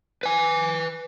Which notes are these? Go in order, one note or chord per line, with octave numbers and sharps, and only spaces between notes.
B4 G#5